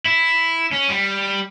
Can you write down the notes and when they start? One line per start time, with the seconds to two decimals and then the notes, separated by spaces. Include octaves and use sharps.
0.05 E4
0.71 C#4
0.88 G3